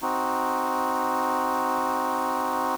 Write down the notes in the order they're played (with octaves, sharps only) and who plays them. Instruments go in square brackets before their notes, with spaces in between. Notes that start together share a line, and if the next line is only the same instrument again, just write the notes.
[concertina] C4 D#4 F#4